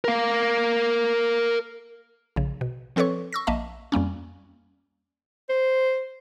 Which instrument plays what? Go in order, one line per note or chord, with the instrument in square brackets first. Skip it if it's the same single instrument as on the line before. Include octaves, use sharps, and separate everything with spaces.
[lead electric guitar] A#4 F5
[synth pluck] A#1 C#3
B2
F3 C4 A4 B4 C#5 C#6
C#6 E6 A#6
A#1 A#3 D#5 E5 A5
F2 G3 A#3 C#4
[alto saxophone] C5